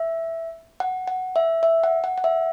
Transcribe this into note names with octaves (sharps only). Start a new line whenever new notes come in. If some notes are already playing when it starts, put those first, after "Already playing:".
Already playing: E5
F#5
F#5
E5
E5
F#5
F#5
F#5
E5